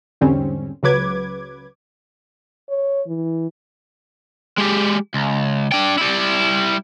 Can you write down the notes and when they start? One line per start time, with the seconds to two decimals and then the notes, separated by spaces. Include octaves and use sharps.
0.21 E2 G#2 D3 G3 C4 C#4
0.83 C#2 C#3 F#3 B4 D6 G#6
2.69 C#5
3.07 E3
4.58 G#3 G4
5.14 C#2
5.72 D4 G5
5.98 G3 E4